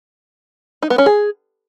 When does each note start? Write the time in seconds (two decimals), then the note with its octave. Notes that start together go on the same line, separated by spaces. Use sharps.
0.82 D#4
0.90 B3
0.98 C#4
1.06 G#4